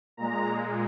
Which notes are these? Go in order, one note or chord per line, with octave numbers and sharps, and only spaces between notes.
A#2 G#3 A#5